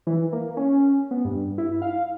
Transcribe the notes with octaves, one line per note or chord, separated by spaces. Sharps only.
E3
A#3
C#4
B3
G2
E4
F5